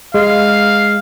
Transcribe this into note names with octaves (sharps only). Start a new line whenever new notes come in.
G#3 F5